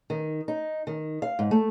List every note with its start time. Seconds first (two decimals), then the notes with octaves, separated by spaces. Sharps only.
0.10 D#3
0.48 D#4
0.87 D#3
1.22 F5
1.39 G#2
1.51 A3